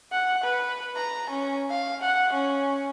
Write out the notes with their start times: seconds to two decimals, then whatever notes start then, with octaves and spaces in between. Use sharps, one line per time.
0.12 F#5
0.43 B4
0.95 A#5
1.30 C#4
1.70 F5
2.01 F#5
2.33 C#4